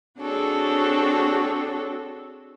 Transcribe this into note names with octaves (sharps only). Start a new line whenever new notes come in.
C4 D4 F#4 G#4 A4 C#5